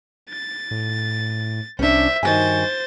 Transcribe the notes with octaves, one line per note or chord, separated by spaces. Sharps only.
A6
A2
C2 C#4 D4 C5 E5
G2 D#3 F#4 C5 G#5 A6